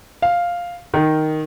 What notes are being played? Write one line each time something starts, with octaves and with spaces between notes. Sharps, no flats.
F5
D#3